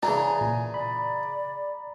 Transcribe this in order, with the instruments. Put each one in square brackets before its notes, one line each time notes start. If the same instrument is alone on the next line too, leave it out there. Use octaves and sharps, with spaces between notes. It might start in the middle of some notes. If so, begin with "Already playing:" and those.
[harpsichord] C#3 E3 D4 [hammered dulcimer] A#5
[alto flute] G#5
[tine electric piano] A#2
[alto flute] D5 [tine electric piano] B5